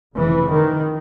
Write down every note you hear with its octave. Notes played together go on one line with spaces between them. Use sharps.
F1 F2 C#3 E3
D#3